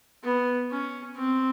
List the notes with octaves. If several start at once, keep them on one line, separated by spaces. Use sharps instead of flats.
B3
C#4
C4